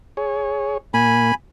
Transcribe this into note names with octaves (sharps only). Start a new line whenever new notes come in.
G#4 C#5
A#2 A#3 G#5 B5